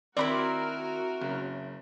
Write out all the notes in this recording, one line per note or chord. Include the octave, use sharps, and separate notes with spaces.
D#3 C4 D#4 E4 F#4 A#4 D5 B5
F#1 C#3